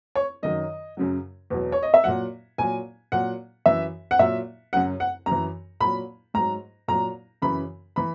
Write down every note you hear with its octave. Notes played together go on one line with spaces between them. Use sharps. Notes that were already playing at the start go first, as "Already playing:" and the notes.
C#5
F#2 D#3 F#3 D#5
F#2 C#3 F#3
E2 B2 F#3
C#5
D#5
E5
A#2 F#3 F#5
A#2 F#3 G#5
A#2 F#3 F#5
F#2 E3 E5
F#5
A#2 F#3 E5
F#2 C#3 F#3 F#5
F#5
F#2 A#5
E3
A#2 F#3 B5
G#2 F#3 A#5
A#2 F#3 A#5
F#2 C#3 E3 B5
E3 B5